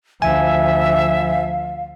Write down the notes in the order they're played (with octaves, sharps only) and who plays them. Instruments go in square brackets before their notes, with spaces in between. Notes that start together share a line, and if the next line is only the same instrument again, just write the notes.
[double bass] D2 F3 [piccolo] E5 [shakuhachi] F5 [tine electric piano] G#5